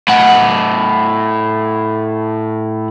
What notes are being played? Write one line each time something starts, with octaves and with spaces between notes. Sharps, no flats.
A2 F#5